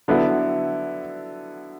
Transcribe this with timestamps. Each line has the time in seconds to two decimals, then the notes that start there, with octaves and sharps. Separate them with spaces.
0.08 D3 F#3 B3 E4